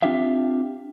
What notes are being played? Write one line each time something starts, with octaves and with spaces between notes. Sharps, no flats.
C4 D4 F4 G4 E5 F5